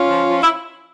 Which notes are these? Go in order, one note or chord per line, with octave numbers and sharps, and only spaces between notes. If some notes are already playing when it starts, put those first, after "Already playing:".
Already playing: C#4 F4
F3
F3
E4